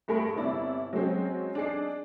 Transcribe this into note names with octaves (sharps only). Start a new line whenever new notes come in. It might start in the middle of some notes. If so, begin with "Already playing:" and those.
G2 A3 G#4 A#4 B5
G1 C3 E4 D5
F#3 G#3 C4 C#4
D4 D#4 G#4 C7